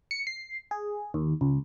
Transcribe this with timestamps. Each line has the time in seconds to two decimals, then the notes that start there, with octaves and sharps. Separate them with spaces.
0.11 C#7
0.27 C7
0.71 G#4
1.14 D#2
1.41 C#2